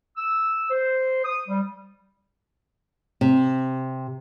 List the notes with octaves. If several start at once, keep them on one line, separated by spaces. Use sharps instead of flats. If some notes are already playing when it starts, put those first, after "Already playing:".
E6
C5
D#6
G3
C3